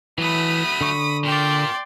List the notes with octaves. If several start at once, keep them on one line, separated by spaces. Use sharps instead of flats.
E3 F#3 A3 B5 D#6
D3 C#6
A#2 D5 G5 C6